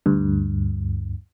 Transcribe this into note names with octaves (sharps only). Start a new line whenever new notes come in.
D2 G2